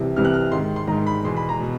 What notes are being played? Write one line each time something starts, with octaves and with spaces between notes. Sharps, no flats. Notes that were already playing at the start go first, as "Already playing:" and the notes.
Already playing: C2 C3 E3
C2 C3 E3 F6
F#6
F6
G#2 D#3 C6
C6
G#2 D#3 A#5
B5
E2 B2 C6
B5
A#5
B2